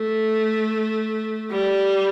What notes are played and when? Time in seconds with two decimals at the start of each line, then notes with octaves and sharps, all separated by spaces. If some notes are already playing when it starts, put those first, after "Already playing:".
Already playing: A3
1.50 G3